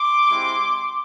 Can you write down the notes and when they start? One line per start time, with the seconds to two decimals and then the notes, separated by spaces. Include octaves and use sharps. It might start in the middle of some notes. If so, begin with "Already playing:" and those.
Already playing: C6 D6
0.30 G#3 C4 E4 G4